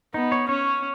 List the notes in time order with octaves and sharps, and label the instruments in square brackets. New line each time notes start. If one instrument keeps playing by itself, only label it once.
[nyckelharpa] B3 [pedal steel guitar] D#4
[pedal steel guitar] C#5
[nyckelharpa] C#4 [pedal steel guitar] C#5